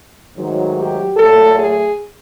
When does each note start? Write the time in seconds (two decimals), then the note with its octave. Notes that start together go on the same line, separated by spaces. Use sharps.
0.36 G#2 D#3 F#3 A3
0.76 G4
1.17 A#2 F#3 A3 A4
1.58 G#4